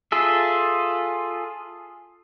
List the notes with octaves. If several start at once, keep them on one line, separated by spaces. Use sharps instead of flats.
F4 G#4 A4 E5